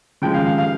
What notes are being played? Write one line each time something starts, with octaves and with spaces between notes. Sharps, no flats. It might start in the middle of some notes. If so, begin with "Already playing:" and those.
C#3 F3 G#3 G5
F5
F5
F5